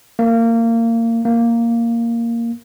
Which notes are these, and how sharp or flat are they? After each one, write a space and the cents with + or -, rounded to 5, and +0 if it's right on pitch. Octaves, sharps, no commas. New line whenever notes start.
A#3 -25
A#3 -5